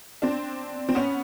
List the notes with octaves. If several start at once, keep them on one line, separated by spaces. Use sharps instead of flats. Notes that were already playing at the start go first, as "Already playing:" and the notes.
C4 D4
C4
B3 C#4